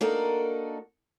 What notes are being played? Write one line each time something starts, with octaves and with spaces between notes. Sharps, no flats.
A#3 D4 D#4 F#4 A4 A#4